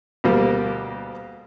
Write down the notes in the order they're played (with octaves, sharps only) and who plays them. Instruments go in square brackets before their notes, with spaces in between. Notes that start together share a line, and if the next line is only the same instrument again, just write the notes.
[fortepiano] D2 B2 G3 A#3